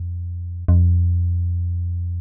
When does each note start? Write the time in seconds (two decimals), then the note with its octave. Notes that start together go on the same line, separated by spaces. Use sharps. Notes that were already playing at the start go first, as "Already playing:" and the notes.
Already playing: F2
0.68 F2